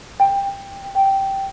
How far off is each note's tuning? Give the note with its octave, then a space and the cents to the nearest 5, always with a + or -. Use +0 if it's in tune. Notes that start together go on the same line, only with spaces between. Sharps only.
G5 +15
G5 -10